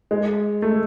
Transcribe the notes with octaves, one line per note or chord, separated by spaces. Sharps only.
G#3
A3